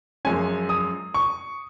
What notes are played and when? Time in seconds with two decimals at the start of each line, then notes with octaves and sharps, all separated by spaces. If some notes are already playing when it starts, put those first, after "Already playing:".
0.25 F#2 F3 G#3 C#4 G#5
0.69 D#6
1.14 C#6